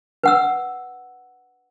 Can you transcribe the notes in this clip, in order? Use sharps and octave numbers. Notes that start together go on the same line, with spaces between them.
B4 F#5 E6